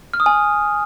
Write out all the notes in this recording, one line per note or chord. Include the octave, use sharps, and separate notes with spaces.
F6
D#6
G#5